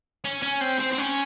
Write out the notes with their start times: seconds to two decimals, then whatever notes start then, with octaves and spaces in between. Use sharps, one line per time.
0.24 C#4
0.42 C#4
0.61 C4
0.80 C4
0.93 C4
0.98 C#4